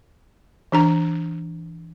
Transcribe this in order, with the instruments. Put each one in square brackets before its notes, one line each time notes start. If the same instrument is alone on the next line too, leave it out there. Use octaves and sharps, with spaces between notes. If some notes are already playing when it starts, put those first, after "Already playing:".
[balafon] E3 D4 A#5